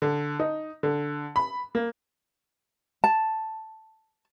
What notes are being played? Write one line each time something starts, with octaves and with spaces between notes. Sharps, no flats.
D3
D#4
D3
B5
A#3
A5